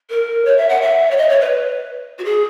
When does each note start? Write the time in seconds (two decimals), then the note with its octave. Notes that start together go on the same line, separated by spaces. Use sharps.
0.10 A#4
0.45 C#5
0.57 E5
0.69 F#5
0.81 E5
1.11 C#5
1.17 D#5
1.29 C#5
1.40 B4
2.19 F#4
2.24 G#4